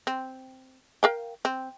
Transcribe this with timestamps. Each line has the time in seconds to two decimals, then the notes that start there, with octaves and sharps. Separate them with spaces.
0.07 C4
1.03 A#4 F5 G5
1.45 C4